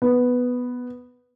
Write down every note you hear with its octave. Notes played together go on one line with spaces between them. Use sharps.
B3